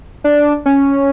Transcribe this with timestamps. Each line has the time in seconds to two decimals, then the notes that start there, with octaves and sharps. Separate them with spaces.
0.24 D4
0.66 C#4